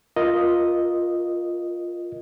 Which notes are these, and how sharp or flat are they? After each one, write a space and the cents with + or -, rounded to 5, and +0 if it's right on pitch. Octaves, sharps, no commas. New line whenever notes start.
F4 +0 A#4 +10 D#5 +0